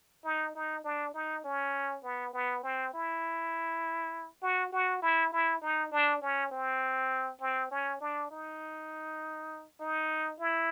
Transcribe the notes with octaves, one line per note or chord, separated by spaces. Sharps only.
D#4
D#4
D4
D#4
C#4
B3
B3
C4
E4
F#4
F#4
E4
E4
D#4
D4
C#4
C4
C4
C#4
D4
D#4
D#4
E4